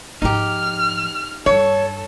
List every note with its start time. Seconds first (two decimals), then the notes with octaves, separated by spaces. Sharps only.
0.22 G#2 F3 D#4 G4 F6
1.46 G2 A4 C#5